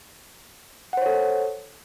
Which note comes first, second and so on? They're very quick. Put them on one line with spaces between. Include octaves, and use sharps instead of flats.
F#5 C5 C#5 A4